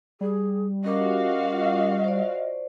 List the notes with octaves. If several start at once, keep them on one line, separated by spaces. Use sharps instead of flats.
G3 G#4
C#4 F4 F#4 A#4 D#5 F5 D6
C5 D5